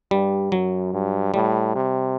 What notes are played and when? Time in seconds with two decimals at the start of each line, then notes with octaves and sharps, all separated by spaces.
0.11 G2 G3
0.52 F#2 F#3
0.93 G2
1.34 A2 G3
1.76 C3